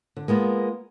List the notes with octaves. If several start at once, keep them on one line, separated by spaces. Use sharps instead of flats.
D3
G#3 A#3 B3 F4